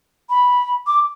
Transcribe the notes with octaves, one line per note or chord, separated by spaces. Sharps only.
B5
D6